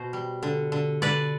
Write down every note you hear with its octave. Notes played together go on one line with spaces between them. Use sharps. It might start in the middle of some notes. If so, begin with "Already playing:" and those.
Already playing: B2 C5
G3
D3
D3
D3 B4 D5